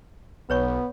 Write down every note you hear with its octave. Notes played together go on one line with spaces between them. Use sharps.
B1 B3 B4 C#5 C#6